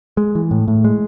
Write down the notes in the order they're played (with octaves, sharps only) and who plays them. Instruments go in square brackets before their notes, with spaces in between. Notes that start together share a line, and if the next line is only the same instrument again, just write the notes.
[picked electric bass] G#3
E3
A2
A2
G#3